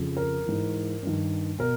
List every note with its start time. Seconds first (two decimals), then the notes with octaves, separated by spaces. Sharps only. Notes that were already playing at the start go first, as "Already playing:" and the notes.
Already playing: F2 C#3 F3
0.17 A#4
0.46 G#2 E3
1.03 G2 D#3
1.59 B2 A#4